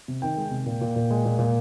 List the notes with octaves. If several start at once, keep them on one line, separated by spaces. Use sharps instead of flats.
C3
D#3 G5
G#3
C3
A#2
A#2
A#2
G#3
A#2
A#2